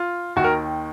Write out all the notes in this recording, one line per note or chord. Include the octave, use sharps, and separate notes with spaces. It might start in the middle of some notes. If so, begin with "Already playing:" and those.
Already playing: F4
D#2 D#3 F#4
A#4